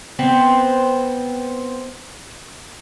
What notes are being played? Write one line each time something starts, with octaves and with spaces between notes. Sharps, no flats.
B3 C4